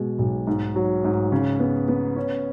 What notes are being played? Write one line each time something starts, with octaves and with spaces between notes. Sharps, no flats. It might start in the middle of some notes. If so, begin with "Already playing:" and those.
Already playing: B2 G#3
B1
G#2
F#3
G#2
C#3
B3
B3
C#4